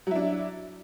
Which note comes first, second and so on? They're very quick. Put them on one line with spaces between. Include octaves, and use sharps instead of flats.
F#3 E4 D4